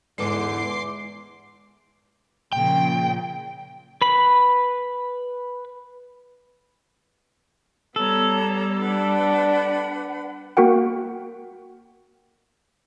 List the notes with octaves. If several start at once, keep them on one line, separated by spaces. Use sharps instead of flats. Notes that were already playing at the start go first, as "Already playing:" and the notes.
E2 G#2 D3 E3 G#3 C6 D6 C7
A#2 C#3 F3 G5
B4 B5
G3 B3 A4 C#5 A#5
D4 B4 F#5 B5
A#3 F#4 A#4 F#5 G5